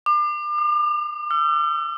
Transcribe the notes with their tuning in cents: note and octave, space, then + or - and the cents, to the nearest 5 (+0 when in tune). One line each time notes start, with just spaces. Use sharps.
D6 +35
D#6 -25
E6 +45